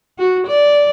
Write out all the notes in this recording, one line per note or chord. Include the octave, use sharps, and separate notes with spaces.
F#4
D5